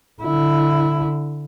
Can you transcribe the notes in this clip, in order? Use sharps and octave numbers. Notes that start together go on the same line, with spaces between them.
D3 E4